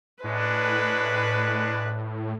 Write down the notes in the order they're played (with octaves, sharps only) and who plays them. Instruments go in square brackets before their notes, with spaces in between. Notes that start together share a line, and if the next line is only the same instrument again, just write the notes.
[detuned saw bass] A2 [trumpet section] G#3 C#4 D4 [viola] B4